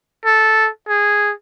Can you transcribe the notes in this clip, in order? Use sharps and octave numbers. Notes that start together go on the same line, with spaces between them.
A4
G#4